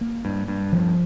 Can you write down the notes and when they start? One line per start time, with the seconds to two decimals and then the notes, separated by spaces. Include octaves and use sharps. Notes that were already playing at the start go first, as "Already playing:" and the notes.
0.01 A#3
0.25 G2
0.48 G2
0.72 F3